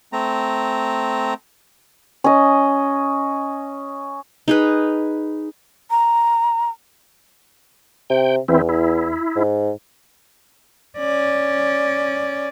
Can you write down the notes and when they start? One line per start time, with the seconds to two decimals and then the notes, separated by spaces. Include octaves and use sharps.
0.13 A3 C4 A#5
2.24 C#4 D#5
4.48 D#4 G#4 B4
5.91 A#5
8.10 C3 G5
8.48 E2 E3 C4 E4
8.69 E4
9.36 G#2
10.98 C#4 D5